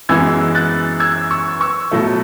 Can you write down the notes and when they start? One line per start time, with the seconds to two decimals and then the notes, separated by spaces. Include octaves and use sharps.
0.09 F#2 E3 G#3 B3 E6 G#6
0.55 F#6 A6
1.00 E6 G#6
1.31 C#6 E6
1.61 C#6 E6
1.91 B2 F#3 A3